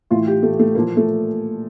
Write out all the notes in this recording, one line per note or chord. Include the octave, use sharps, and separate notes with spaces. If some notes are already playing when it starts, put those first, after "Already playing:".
A2 E3 F4
G4
A3
A3
A#2 F3 A#3
A3